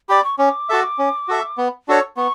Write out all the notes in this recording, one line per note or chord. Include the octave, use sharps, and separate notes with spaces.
G4 D5 B5
C#6
C#4 D6
F#4 A4 E5
C#4
F#4 A4 E5
B3
D4 F#4 A4 C#5
B3 C#6